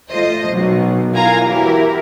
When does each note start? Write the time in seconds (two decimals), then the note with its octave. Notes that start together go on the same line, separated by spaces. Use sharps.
0.10 A3 F4 C5 D#5
0.50 B1 B2 F#3
1.12 E4 F4 A#4 F5 G#5 A#5
1.44 E3 F#3 E4 G4 A#4